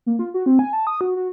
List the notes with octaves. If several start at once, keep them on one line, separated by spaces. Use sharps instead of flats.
A#3
F4
F#4
C4
G#5
A5
D#6
F#4
F#4